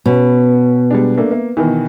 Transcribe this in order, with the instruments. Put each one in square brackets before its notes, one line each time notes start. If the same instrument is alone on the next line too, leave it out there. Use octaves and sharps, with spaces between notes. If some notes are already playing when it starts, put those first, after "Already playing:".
[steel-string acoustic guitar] B2 [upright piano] C#4
[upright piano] G3 G#3 D4
A3 A#3 D4
A#3 E5
B2 D#3 E3